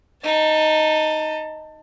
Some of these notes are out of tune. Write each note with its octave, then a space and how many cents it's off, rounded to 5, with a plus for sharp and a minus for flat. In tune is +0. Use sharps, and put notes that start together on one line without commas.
D#4 +0 A5 +20